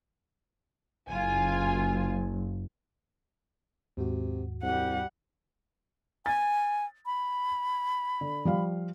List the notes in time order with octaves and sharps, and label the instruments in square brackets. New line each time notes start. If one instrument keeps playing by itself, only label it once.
[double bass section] F#1 [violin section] F4 G#5
[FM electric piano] D#2 G#2 F#4 [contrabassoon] C3
[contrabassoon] C2 [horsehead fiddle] G3 F#5
[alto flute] G#5 [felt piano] A6
[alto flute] B5
[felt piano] D3
F3 G3 F5